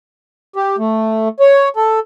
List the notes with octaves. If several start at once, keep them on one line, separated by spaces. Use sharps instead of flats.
G4
A3
C#5
A4